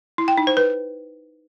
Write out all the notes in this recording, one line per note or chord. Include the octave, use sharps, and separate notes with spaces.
E4
G5
D#4
C5
B4